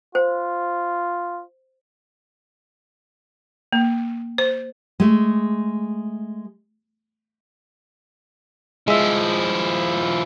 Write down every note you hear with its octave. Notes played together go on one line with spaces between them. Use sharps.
F4 C5
A#3
C5
G#3 A3
F3 G#3 E4 E5